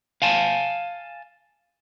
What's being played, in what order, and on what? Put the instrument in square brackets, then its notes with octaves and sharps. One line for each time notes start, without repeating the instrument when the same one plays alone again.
[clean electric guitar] F5 G#5 A5